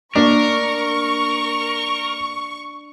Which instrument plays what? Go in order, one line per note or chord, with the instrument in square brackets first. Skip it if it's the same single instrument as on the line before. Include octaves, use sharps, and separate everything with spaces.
[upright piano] A#3 [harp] D4 [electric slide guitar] A#4 [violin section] C#6